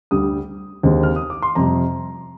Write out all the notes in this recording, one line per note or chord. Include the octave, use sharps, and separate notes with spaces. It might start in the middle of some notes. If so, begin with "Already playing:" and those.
D2 D3 G3 D#6
D#2 D3 G#3 C4
F6
D#6
D6
C6
F2 C3 G3 A#5